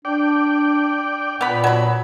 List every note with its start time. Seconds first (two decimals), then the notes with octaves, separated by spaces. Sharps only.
0.05 D4 D5 G5
1.41 A#2 B3 B5
1.64 F#3 B5